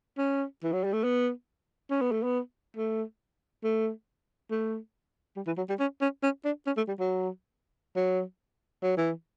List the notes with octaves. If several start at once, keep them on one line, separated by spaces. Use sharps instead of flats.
C#4
E3
F#3
G3
A3
B3
C#4
B3
A3
B3
A3
A3
A3
G3
E3
F#3
G3
C#4
C#4
C#4
D4
C#4
A3
G3
F#3
F#3
F#3
E3